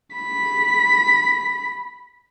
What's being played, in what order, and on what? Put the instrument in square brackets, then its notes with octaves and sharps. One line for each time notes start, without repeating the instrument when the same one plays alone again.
[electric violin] B5 B6